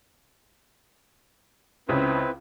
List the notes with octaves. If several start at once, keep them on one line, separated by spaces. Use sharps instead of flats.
C#2 C#3 C4 E4 B4